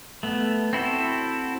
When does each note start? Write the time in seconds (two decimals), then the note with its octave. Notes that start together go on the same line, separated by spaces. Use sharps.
0.23 A3 B3
0.73 C4 E4 F#4 A4